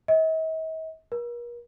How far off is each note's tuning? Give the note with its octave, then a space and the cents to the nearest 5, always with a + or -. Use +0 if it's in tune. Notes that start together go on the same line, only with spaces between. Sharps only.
D#5 +45
A#4 +40